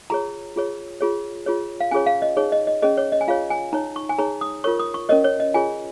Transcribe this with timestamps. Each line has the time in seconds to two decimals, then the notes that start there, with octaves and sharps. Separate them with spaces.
0.10 F4 G#4 C#5 A#5
0.56 F4 G#4 C#5
1.01 F4 G#4 C#5
1.46 F4 G#4 C#5
1.81 F5
1.91 C#4 F4 G#4 C#5 G#5
2.06 F5
2.22 D#5
2.37 D#4 G#4 C#5
2.52 D#5
2.67 D#5
2.82 C#4 G#4 C#5 D#5
2.97 C#5
3.12 D#5
3.21 G#5
3.28 F4 G#4 C#5 F5
3.50 G#5
3.73 D#4 C#5 A#5
3.96 C#6
4.09 G#5
4.18 D#4 G#4 C#5 A#5
4.41 D#6
4.64 F4 A#4 C#5 C#6
4.79 D#6
4.94 C#6
5.09 C#4 A#4 C#5 D#5
5.24 C#5
5.40 D#5
5.54 F4 G#4 C#5 G#5